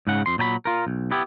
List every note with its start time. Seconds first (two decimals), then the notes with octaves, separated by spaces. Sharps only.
0.07 G#2 C#3 F#5
0.26 F2 C6
0.38 A#2 F#3 G#5 B5
0.65 F4 A#4
0.87 B1
1.11 B3 E4 G4